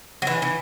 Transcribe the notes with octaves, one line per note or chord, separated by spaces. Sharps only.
F#3
E3
E3